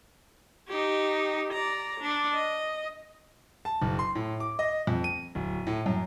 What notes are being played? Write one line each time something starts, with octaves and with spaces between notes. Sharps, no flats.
D#4 G4
D5 A#5
D4
D#5
A5
F#1
C6
A2
D6
D#5
F2
D#7
D1
A2
F#2